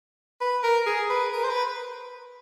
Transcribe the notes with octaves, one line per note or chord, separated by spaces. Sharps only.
B4
A#4
G#4
B4
A#4
C5
B4